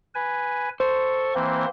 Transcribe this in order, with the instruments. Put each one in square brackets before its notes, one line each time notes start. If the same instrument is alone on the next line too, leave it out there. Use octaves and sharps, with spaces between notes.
[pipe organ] B4 G#5
[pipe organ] A4 C#6 [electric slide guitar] C5
[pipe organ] E3 A#3 C4